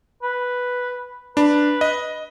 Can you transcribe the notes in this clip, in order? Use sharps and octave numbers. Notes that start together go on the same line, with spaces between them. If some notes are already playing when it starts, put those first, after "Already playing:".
B4
D4 B4
D#5